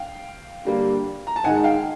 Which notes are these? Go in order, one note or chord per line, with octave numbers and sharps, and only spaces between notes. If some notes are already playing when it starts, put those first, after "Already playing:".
Already playing: F5 G5
D3 G3 A#3
A#5
A5
G#2 D#3 G#3 F#5 G#5
F5 G5